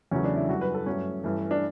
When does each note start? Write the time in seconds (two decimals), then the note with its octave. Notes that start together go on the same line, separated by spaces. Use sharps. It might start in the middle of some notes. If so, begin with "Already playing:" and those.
0.11 E2 C#3 F#3 A3 C#4
0.24 D4
0.36 E4
0.48 F#2 E3 G3 F#4
0.61 B4
0.74 A4
0.86 G2 F#3 A3 C#4
1.23 G2 E3 A3
1.51 D4